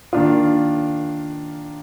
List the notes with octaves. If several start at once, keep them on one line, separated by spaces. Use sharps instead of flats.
D#3 A#3 D4 F4